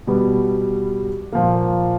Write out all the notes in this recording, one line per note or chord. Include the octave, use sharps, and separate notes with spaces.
B2 G3 B3
A#2 F3 A#3